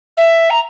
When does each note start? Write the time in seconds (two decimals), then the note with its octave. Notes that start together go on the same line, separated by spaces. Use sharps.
0.17 E5
0.50 A#5